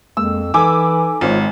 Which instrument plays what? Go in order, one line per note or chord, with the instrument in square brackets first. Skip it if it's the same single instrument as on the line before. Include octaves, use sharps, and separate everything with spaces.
[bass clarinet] F2 [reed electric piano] G#3 A#3 [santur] E6
[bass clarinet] E3 [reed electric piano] D#4 A4 [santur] G#5 B5 [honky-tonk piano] D6 E6
[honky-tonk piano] G#1 [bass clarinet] G#3 [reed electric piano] F4 C5 C#5